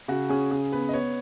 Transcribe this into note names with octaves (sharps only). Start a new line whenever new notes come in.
C#3 F#4
C#4 G#4
C#3 G#4
B3 B4
D#5
B3 C#5